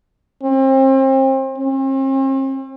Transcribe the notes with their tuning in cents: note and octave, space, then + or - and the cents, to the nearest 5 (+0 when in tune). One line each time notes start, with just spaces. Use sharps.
C4 +35
C4 +45